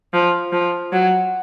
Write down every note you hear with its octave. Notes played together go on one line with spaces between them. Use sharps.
F3
F3
F#3